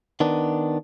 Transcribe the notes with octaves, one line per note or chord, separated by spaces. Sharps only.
D#3 B3 D4